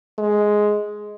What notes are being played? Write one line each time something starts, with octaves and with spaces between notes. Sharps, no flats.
G#3